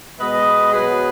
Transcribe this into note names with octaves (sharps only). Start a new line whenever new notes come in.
B2 G#3 B3 B4 D#5
B2 F#3 B3 G#4 B4